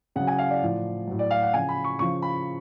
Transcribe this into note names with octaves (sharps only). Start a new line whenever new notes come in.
C#3 F#3 F#5
G#5
F5
D5
A2 F3
A2 F#3
D5
F5
F#5
C#3 F3 G#5
B5
C#6
C#3 F3 C#6
B5